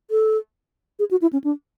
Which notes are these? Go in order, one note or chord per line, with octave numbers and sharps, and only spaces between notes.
A4
G#4
F#4
E4
C#4
D4